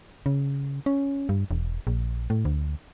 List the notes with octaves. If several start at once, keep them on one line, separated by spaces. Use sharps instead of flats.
C#3
C#4
G2
E1
A#1
A2
D2